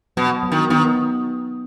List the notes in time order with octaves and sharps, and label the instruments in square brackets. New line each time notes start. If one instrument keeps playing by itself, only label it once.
[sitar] B2 [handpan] F#3 B3
[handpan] F#3 B3
[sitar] D#3
[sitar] D#3 [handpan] B3 D#4